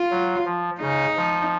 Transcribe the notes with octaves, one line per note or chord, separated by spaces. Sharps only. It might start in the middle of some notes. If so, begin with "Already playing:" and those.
Already playing: F4
F#3
F3
C#3 D#4
F3